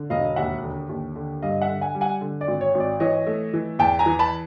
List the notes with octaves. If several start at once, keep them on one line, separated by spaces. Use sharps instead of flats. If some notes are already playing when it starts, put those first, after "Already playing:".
Already playing: D3
E1 D#5 F5
D#2 E5 F#5
D3
D#2
D3
G2 D#5 F5
E5 F#5
D3
F#5 G#5
G3
F#5 G#5
D3
D5
G#1
C#5
G#1
D5
E3 C#5 D#5
A3
E3
E2 G5 A5
G#5 A#5
E3
A5 B5